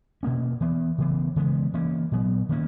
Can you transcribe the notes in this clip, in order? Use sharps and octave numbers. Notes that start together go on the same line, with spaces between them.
B2 A#3 C#4
E3 B3
C#3 E3 B3
C#3 E3 G#3 B3
E3 A#3 C#4
A#2 F#3 B3
D#3 A#3 C#4